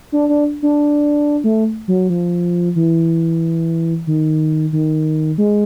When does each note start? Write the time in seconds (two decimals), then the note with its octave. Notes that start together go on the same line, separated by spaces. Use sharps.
0.12 D4
0.29 D4
0.62 D4
1.44 A3
1.88 F#3
2.10 F3
2.76 E3
4.07 D#3
4.72 D#3
5.38 G#3